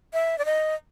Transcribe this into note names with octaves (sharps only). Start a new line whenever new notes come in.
E5
D5
D#5